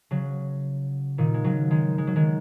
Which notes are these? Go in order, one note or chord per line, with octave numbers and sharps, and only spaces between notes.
C#3 F#3
A#2 D#3
G#3
C#3 F#3
D#3 G#3
G#3
F#3
D#3 G#3